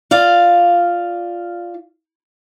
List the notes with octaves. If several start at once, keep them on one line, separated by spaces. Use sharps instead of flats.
F4 D5 F5